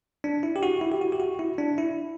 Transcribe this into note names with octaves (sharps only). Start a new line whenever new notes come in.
D4
E4
G4
F#4
E4
G4
F#4
G4
F#4
E4
D4
E4